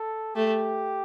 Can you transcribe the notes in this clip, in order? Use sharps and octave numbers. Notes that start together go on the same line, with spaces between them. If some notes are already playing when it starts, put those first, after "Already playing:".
Already playing: A4
A3 G4